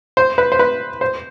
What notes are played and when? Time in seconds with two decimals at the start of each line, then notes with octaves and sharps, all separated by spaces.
0.17 C5
0.38 B4
0.52 C5
0.59 B4
1.01 C5